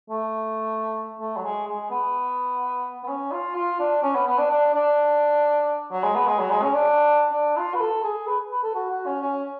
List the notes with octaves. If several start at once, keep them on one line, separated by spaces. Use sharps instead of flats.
A3
A3
F#3
G#3
G#3
B3
B3
C#4
F4
F4
D4
C#4
B3
B3
D4
D4
D4
F#3
G#3
B3
G#3
F#3
G#3
C#4
D4
D4
F4
B4
A4
G#4
B4
B4
A4
F#4
F#4
C#4
C#4